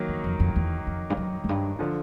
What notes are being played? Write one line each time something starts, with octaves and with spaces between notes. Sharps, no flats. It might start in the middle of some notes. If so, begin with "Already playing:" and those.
Already playing: D#3 F#3 A#3
F2
F2
F2
E2
F2
G2
F#2
F#2
G2
D3 F3